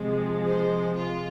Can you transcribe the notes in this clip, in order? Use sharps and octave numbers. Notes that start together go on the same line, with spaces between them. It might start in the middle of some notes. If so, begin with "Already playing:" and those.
Already playing: C3 F3 G#3
C5
F4